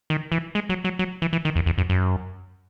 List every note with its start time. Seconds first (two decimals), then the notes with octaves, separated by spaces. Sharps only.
0.10 D#3
0.32 E3
0.55 G#3
0.69 F#3
0.84 F#3
0.99 F#3
1.22 E3
1.33 E3
1.45 D#3
1.56 E2
1.66 E2
1.78 F#2
1.90 F#2